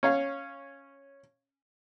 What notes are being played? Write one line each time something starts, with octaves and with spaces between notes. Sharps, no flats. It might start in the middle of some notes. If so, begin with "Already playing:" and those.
C#4 C#5 F5